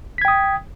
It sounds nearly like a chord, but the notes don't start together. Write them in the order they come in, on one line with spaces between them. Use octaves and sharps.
B6 G#6 G5 D#6